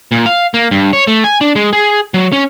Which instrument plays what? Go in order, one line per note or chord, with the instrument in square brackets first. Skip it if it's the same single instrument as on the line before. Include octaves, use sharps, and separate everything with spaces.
[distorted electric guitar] A#2
F5
A#3
G2
C#5
A3
G#5
D4
G#3
G#4
F#3
C#4